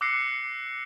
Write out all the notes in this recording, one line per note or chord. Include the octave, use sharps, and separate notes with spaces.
D6 E6 F#6 A#6 C7 C#7